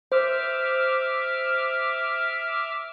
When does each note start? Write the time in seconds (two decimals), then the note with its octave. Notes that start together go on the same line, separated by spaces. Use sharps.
0.12 C5 E5 D6 F6